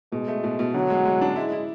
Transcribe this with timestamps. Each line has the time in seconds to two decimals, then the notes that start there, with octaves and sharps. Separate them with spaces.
0.12 B2 G#3
0.28 A3
0.44 B2
0.59 B2
0.74 D3 F#3
0.90 G#3
1.05 G#3
1.21 D4
1.36 G#3 E4
1.52 E4